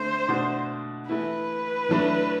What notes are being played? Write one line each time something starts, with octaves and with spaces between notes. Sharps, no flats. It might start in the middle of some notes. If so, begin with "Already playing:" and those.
Already playing: D3 A3 C4 C5
B2 A3 D4 F#4
E3 A3 E4 B4
A2 F#3 A3 D4